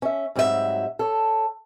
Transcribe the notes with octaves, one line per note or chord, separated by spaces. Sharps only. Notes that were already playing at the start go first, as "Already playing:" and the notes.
C#4 E5
G#2 F#3 G3 C4 F#4 E5
A4 C#5